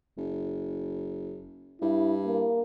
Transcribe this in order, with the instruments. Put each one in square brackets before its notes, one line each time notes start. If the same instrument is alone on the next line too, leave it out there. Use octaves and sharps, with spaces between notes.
[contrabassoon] F#1
[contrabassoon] G2 [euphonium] E4
[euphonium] A#3